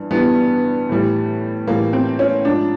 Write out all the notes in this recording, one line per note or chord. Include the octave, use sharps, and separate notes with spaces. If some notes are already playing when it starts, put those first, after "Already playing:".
Already playing: G2 E3
G2 E3 G3 B3
A2 E3 G3
A2 E3 G3 A#3
C4
C#4
G#2 F3 D4